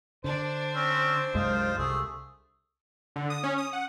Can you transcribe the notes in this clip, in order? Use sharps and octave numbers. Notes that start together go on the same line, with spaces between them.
D3 D4 C5
C4 C#4
C2 F#2 G#3 D#4 F4
C2 A3 G#4
D3
D#6
C#4
D#6
F#5